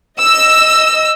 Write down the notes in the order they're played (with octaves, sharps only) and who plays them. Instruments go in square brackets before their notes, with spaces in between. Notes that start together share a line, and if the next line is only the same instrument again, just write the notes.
[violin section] D#5 E6